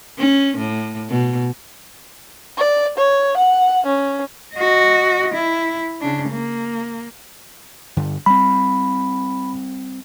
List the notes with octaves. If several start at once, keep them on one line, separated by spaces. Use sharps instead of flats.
C#4
A2
B2
D5
C#5
F#5
C#4
F#4 D#5
E4
C#3 D4
A#3
G2 D3
G3 C4 B5